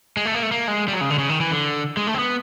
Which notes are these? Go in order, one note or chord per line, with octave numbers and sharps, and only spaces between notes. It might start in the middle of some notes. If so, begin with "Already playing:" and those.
G#3
A3
A#3
A3
A#3
G#3
G3
F#3
C#3
D3
C#3
D#3
E3
D3
G#3
A3
C4
B3